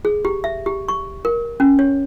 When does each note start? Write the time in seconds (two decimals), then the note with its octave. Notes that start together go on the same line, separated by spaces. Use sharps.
0.05 G#4
0.25 G4
0.44 E5
0.66 G4
0.88 C#6
1.25 A#4
1.60 C#4
1.79 C#5